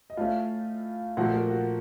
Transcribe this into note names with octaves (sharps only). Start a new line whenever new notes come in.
D#5
A2 A3 C#4 F4 F5
A#2 F3 A3 F#4 F#5
A4
A#3 A#4
F#4